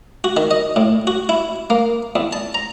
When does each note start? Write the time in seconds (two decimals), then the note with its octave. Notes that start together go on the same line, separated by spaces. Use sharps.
0.24 F#4
0.37 D#3
0.51 D#5
0.76 A2
1.07 F#4
1.29 E4
1.70 A#3
2.15 E2
2.33 A5
2.54 A#5